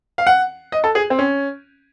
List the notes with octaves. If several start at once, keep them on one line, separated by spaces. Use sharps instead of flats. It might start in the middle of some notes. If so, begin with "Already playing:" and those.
F5
F#5
D#5
A4
G#4
C4
C#4